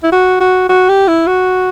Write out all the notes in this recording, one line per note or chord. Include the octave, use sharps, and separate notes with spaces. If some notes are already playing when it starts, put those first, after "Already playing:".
E4
F#4
F#4
F#4
G4
E4
F#4